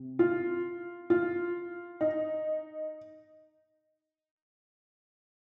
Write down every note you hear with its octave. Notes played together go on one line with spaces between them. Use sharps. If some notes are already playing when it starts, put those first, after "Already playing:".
Already playing: C3
F4
F4
D#4